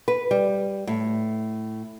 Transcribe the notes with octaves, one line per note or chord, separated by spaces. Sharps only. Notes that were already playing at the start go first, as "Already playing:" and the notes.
B4
G3
A2